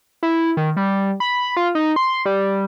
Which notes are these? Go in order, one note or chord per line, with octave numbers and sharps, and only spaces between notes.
E4
D#3
G3
B5
F4
D#4
C6
G3